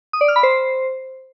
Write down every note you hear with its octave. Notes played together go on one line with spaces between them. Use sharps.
D#6
D5
F6
B5
C5